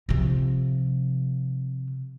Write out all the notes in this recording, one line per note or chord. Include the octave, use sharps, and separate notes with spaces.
C3 F3